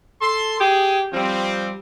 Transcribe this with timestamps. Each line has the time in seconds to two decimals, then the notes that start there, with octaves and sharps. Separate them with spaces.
0.21 A4 C6
0.59 G4 G#4
1.13 F3 G3 C4